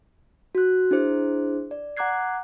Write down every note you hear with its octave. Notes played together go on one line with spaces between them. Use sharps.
F#4 F#6
D4 E4 G#4 C5
D5
F#5 A#5 D6 F#6 G#6 C7